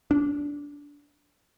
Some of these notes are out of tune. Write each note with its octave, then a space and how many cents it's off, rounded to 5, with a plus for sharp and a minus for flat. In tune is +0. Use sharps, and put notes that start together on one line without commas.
D4 -20